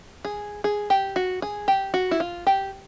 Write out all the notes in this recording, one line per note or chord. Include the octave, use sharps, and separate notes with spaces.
G#4
G#4
G4
F#4
G#4
G4
F#4
E4
F4
G4